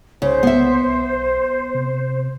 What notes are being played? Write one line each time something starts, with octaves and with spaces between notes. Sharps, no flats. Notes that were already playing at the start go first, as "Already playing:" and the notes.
C2 C#3 C5
B3 E5
B1
C3